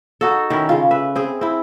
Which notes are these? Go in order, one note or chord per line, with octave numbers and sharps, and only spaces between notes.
D#4 F#4 A4
D#3 C#4 E4
C#3 F4
B4 E5
C4 G#4
C4 E4